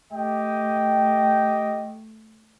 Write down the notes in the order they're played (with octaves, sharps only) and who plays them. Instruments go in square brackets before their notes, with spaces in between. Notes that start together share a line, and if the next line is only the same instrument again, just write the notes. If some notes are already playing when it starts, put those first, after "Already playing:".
[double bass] A3 [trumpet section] G4 D#5 G5